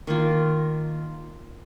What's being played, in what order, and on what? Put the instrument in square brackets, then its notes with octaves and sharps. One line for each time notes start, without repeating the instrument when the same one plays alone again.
[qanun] D#3 A#3 F4